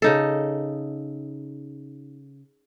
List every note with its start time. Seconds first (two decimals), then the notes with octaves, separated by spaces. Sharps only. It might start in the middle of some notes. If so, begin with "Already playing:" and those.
0.02 C#3 D#4 A4